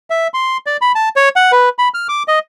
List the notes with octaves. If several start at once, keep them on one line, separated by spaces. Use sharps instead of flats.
E5
C6
D5
B5
A5
C#5
F#5
B4
B5
F6
D6
D#5